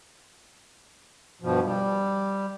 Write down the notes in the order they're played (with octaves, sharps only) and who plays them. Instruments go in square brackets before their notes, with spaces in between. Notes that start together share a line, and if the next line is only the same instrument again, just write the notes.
[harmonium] G2 B2 F3
G3